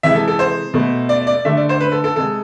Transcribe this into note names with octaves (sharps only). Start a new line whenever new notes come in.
C3 E3 G#3 E5
A4
A4
C5
B2 A3
D5
D5
D3 A3 E5
D5
C5
B4
A4
A4
C3 G#3 A4